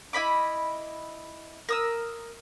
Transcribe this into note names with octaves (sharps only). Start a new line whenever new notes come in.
E4 D#5 B5 D6
A#4 D#6 E6